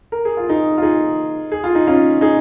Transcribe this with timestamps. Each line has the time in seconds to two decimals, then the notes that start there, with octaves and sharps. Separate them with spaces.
0.12 A#4
0.25 G#4
0.37 F4
0.49 D#4 G#4
0.78 F4
0.82 D#4 G#4
1.52 G#4
1.64 F4
1.75 D#4
1.87 C#4 F4
2.21 D#4 G#4